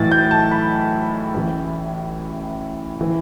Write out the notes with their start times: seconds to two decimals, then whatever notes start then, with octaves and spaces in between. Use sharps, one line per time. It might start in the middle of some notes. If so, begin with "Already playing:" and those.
Already playing: B1 A2 E3 A6
0.12 G6
0.31 A5
0.51 B5
1.34 A1 A2 E3
3.01 E3